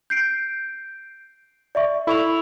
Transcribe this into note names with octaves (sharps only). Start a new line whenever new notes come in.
G6 C7 D7
D5 E5 C#6
E4 A4 C#6 F7